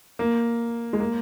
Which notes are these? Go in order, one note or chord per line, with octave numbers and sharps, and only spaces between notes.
A#3
G#3
A#3